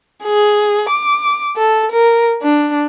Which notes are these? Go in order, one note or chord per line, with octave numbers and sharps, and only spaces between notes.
G#4
D6
A4
A#4
D4